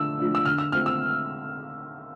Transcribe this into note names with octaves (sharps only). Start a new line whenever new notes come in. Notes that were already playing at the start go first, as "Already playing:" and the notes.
Already playing: D3 F3 A3 D4 E6
F3 A3 D4
E6
D3 F6
E6
A3 C4 F4 F6
E6